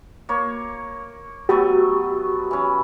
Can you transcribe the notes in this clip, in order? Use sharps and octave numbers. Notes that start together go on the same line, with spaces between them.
A#3 C#5
F#3 A3 B3 F#4 G4
E3 C#4